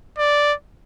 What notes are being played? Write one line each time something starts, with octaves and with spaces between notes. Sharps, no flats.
D5